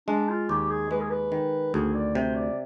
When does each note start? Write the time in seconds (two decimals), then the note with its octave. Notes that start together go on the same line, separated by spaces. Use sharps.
0.08 G#3 D4
0.29 F4
0.49 D#2 G4
0.70 G#4
0.91 G#3 B4
1.00 G#4
1.10 B4
1.32 D#3
1.74 D2 G#4
1.94 D5
2.15 C3 C5
2.35 D5